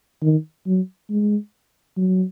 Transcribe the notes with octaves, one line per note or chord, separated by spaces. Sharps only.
D#3
F#3
G#3
F#3